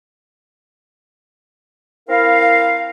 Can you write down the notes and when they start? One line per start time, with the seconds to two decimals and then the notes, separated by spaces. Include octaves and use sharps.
2.09 C4 E4 A#4 F5